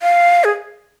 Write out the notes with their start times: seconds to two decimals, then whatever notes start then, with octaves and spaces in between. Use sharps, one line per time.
0.02 F5
0.44 G#4